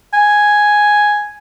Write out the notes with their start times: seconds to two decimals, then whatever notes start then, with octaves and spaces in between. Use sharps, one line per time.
0.14 G#5